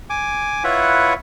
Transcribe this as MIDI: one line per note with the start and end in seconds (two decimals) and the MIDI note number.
0.10 0.63 80
0.10 0.63 86
0.64 1.14 64
0.64 1.14 65
0.64 1.14 71
0.64 1.14 73
0.64 1.14 76
0.64 1.14 78